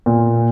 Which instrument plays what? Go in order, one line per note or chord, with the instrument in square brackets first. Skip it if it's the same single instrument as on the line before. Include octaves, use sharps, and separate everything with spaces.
[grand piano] A#2